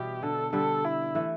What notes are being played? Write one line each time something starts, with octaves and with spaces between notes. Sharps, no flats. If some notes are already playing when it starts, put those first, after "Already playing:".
Already playing: B2 E3 G3 G4
D3 A4
D3 G3 A4
E4
E3 A3